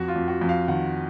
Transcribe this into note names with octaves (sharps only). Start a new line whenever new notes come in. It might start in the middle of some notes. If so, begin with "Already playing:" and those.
Already playing: F2 F#4
F4
F2
F#4
F2
F5
D#3 F#5